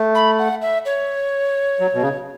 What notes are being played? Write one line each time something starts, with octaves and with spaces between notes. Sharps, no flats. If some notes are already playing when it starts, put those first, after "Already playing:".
Already playing: A3
B5
F#5
E5
C#5
F#3
B2
C#3